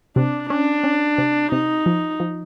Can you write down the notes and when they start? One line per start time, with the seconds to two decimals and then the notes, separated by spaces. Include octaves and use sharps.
0.16 C3 D4
0.50 C#4 D4
0.84 C#4
1.18 C3
1.52 C3 D#4
1.86 F3
2.20 F3